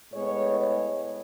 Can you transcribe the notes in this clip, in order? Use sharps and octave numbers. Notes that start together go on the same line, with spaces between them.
A2 G#3 B3 C#5
C#5